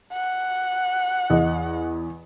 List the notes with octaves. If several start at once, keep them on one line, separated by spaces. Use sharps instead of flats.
F#5
E2 D#5